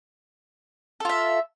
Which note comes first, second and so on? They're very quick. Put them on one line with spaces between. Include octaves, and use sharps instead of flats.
A4 F4 E5